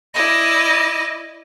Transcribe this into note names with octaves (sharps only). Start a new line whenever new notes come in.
E4 D5 D#5 A#6